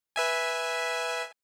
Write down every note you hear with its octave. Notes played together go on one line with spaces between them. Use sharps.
B4 E5 G#5